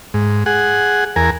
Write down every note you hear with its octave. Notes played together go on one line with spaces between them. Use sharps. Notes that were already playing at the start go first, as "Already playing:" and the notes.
G#2
G#4 F#5
E2 A#4 G#5